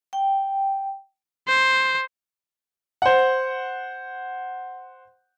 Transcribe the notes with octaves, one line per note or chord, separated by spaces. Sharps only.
G5
C5
C5 F#5